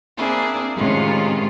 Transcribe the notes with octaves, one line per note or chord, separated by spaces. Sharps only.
A#3 C4 D4 E4 G#4
A2 C3 D#3 G#3 C#4 F4